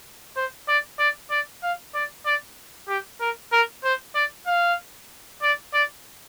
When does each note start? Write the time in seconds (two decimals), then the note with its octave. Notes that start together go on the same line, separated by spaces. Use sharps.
0.36 C5
0.68 D5
0.99 D5
1.30 D5
1.63 F5
1.94 D5
2.25 D5
2.88 G4
3.21 A#4
3.52 A#4
3.84 C5
4.15 D5
4.46 F5
5.42 D5
5.74 D5